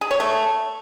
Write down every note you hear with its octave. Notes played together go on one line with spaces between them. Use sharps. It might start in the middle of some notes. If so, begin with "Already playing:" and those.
G#4
C#5
A3